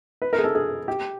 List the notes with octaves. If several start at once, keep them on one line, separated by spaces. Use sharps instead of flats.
B4
A#4
G#4
A4
G#4
G4